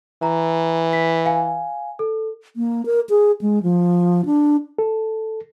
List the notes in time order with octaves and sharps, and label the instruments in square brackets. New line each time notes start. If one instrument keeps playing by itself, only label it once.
[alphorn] E3 [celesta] A#5
[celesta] B6
F5 G#5
A4
[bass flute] A#3
A#4
G#4
G#3
F3
D4
[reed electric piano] A4